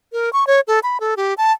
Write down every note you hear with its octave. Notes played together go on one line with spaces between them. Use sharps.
A#4
C#6
C#5
A4
B5
A4
G4
A5